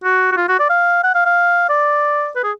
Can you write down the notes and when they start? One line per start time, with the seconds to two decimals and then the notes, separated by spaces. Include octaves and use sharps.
0.04 F#4
0.32 F#4
0.37 F4
0.48 F#4
0.60 D5
0.70 F5
1.04 F#5
1.15 F5
1.25 F5
1.69 D5
2.36 B4
2.44 G#4